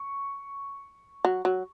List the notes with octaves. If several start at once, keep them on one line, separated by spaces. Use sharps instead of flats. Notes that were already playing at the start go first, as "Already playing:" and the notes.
Already playing: C#6
F#3
F#3